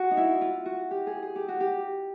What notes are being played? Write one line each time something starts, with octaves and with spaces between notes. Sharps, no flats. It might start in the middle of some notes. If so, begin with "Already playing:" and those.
Already playing: F#4
D#4
E4
F4
F#4
G4
G#4
G#4
G4
F#4
G4